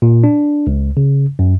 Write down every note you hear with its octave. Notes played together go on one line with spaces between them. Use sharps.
A#2
D4
C#2
C#3
F#2